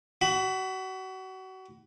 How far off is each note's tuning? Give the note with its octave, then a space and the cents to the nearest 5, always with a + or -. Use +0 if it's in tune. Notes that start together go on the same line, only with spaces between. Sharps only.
F#4 +30 B5 +10